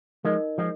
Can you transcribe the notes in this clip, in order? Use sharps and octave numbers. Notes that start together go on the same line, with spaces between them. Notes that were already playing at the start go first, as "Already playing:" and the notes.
F3 G#3 D#4 A#4 D#5
F3 G#3